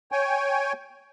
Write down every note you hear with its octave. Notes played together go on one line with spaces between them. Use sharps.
C#5 G5 G#5